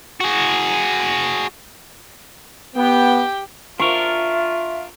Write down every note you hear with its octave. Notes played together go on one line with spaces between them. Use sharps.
F#4 G#4
B3 G4 G5
D4 F4 A#4 E5 C#6